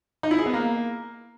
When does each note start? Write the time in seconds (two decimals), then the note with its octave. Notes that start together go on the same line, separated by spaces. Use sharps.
0.23 D#4
0.31 E4
0.38 G#4
0.46 B3
0.53 A#3